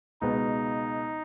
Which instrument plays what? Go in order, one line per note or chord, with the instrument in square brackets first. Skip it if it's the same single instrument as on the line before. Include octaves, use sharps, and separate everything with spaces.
[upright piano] C#2 B2 G#3 B3 [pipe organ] D#4